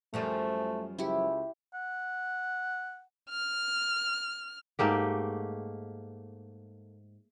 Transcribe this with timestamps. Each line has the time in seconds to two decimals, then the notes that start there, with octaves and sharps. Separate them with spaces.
0.14 F#2 F3 G3 A3
0.99 C#2 E4 G4
1.74 F#5
3.30 F6
4.79 G#2 A3 A#3 G4